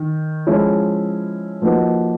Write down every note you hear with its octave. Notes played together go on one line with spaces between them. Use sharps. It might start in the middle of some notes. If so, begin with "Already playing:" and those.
Already playing: D#3
F3 G#3 C#4 E4
F3 A#3 D#4 F#4 B4